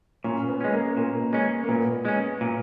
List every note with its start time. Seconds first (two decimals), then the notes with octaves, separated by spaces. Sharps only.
0.24 A#2 C#4
0.48 B3
0.61 G#3 C#4
0.73 A#3
0.97 A#2 A#3
1.33 G#3 C#4
1.64 A#3
1.69 A#2 B3
2.05 G#3 C#4
2.41 A#2